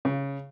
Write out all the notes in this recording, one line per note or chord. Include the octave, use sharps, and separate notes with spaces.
C#3